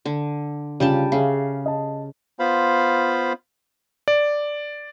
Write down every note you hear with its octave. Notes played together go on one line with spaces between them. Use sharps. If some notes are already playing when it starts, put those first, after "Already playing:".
D3
C#3 G3 F4 G4 A5
C#3 G#4 E5 F5
D#5 A5
B3 F4 C5 F5 B5
D5